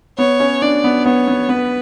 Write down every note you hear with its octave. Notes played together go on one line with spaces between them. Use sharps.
B3 C#5
C#4
D4 D5
B3
B3 C#5
B3
B3 B4